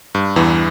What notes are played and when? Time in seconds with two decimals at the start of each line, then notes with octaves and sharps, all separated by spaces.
0.15 G2
0.36 E2 E3